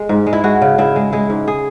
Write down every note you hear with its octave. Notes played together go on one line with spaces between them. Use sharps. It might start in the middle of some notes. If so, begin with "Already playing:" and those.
Already playing: G#3
G#2
G#3
E4
G#3 F#4
C#3
C#3 E4
G#3
G#3 E4
G#2
G#4